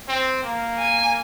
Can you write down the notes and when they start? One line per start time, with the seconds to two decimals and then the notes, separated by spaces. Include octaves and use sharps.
0.08 C4
0.44 A#3
0.79 G#5